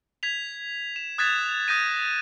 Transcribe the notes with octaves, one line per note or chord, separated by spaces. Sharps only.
G#6 B6 F7
E7
D#6 F#6 G#6 A6 B6 E7
D#6 G6 A#6 D#7